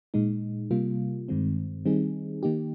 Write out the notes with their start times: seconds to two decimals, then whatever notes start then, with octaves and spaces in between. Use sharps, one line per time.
0.14 A#2 G#3 D#4
0.71 C3 G3 A#3 F4
1.28 G2 D#3 G#3 C4
1.85 D#3 G3 C4 D#4 G#4
2.43 D#3 A#3 D#4 G4